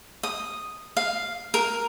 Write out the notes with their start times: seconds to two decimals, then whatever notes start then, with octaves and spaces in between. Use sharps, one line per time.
0.23 D#6
0.97 F5
1.54 A#4